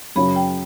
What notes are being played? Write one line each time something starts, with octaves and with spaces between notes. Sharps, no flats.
F#2 C#3 F#3 B5
G5